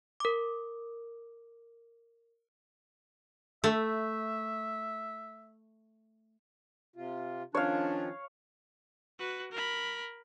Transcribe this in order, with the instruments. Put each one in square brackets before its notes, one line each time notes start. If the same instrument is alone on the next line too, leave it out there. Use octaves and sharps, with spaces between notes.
[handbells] A#4 D6
[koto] A3 [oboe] E5
[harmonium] C3 F4
[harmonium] D#3 F3 F4 [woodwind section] C#4 D4 [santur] C#5 F5
[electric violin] F#4 B4
A#4 B5